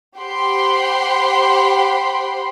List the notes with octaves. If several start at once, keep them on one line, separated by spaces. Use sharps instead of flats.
G4 C5 F#5 G5 B5 C6